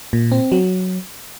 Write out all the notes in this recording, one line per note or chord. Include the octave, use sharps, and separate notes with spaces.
A#2
C4
F#3